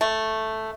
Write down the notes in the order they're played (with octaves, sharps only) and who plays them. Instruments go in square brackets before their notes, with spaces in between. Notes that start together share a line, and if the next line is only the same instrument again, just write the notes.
[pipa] A3